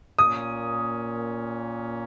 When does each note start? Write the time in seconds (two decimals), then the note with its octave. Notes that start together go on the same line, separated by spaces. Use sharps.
0.19 A#2 A#3 C#4 D#6